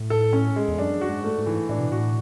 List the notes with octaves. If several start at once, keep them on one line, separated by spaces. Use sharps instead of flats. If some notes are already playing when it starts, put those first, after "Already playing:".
Already playing: A2
A4
C#4
G#3
E2
F#2 D4
F#4
G#2
A3
G#2
E3
A2 D4
B2
A2 F#4